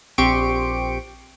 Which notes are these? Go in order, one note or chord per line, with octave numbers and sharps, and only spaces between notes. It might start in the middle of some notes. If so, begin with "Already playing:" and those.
A#1 C4 G4 C6 C#6 D7